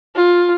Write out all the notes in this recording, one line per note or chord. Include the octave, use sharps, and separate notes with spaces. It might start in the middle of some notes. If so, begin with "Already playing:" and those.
F4